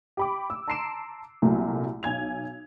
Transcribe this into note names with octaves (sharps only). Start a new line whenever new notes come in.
G4 B5 D6
E6
A5 A#5 C6 C7 D7 E7
C2 A#2 F#3 A3 A#3
B1 G#5 G#6 F7